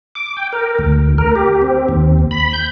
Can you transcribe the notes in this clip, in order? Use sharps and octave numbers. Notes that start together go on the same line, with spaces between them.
D6
G5
A#4
D2
A#4
G4
C4
D#2
B5
G6